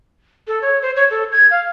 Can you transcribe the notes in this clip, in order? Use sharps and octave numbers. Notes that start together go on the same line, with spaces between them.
A4
C#5
C5
C#5
A4
G#6
F5